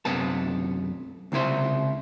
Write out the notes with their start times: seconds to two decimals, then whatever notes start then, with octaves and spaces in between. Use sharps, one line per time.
0.05 B1 F#2 C3 B3 A5
1.32 C#2 C3 E4 C5